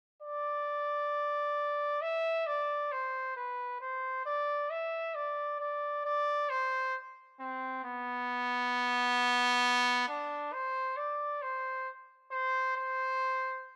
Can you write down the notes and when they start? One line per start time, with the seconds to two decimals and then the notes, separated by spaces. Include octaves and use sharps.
0.22 D5
2.02 E5
2.47 D5
2.92 C5
3.37 B4
3.81 C5
4.26 D5
4.71 E5
5.15 D5
5.60 D5
6.05 D5
6.50 C5
7.40 C4
7.84 B3
10.08 D4
10.53 C5
10.97 D5
11.42 C5
12.31 C5
12.76 C5